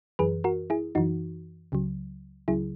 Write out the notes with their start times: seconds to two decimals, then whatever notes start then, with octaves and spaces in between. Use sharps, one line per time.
0.19 F#2 E3 G#4 B4
0.44 F#4 A#4
0.70 E4 G#4
0.95 F#2 E3 D#4 F#4
1.72 C#2 C#3 F#3
2.48 C#2 C#3 F#3 E4 G#4